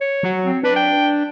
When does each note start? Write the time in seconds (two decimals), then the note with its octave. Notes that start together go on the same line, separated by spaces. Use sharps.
0.01 C#5
0.23 F#3
0.45 C4
0.63 D4 B4
0.76 G5